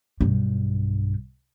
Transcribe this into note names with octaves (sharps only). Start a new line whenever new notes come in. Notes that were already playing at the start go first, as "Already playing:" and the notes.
B1 G2